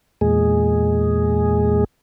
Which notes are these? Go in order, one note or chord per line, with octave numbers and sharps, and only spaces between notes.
E2 A#2 G#3 G#4